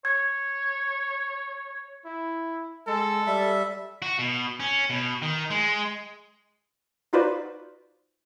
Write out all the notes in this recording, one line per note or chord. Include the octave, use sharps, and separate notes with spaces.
C#5 G#6
E4
G#3 A4
G3 E5
F#4
B2
C#4
B2
D#3
G#3
D#4 F4 F#4 B4 C5 D5